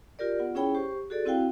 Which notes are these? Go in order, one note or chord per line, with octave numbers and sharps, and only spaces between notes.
F4 G4 A#4 D5
B3 F4 F#5
C#4 E4 G#4 C#5 G5 B5
G4 C5 C#6
F#4 G#4 A4 D5
C4 E4 F#4 F5 G5